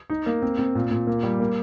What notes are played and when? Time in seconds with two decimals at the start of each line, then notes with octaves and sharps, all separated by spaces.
0.10 D#4
0.26 A#3
0.42 C4
0.59 C4
0.75 A#2
0.91 A#2
1.07 A#3
1.23 G3
1.40 A#3